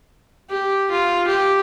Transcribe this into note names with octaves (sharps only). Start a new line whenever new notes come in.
G4
F4
G4